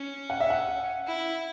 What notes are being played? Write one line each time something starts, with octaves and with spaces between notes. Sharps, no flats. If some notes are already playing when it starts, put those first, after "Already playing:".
Already playing: C#4
F#5
E5
F#5
E4